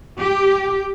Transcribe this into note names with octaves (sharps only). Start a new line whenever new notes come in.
G4